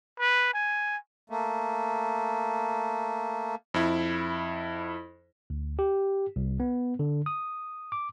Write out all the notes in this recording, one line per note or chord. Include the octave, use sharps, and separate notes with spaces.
B4
G#5
A3 A#3
F2 E4
D2
G4
C2
B3
D3
D#6
D6